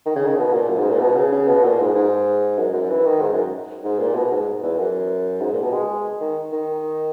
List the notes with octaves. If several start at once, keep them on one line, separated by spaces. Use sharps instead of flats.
D#3
C#3
D#3
B2
A#2
F#2
G#2
A#2
B2
C#3
C#3
B2
A#2
G#2
G#2
F#2
F#2
E3
D#3
G#2
F#2
G#2
A#2
B2
G#2
E2
F#2
G#2
A#2
B2
G#3
D#3
D#3